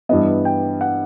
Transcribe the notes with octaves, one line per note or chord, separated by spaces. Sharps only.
G2 E3 G3 B3 D#5
G5
F#5